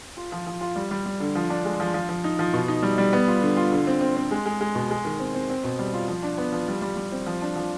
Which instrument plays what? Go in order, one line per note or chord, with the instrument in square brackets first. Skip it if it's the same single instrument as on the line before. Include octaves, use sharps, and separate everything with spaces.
[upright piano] F4
F3
F3
F4
G3
G3
G3
D3
F3
D4
G#3
F3
F3
F3
D#4
F3
B2
D#4
G3
G3
B3
F4
D3
F4
D3
C4
C4
C4
G#3
G#3
G#3
B2
G#3
D#3
C4
C4
C4
B2
G3
F4
F3
D4
B3
F3
G3
G3
G3
C4
F3
D4
F3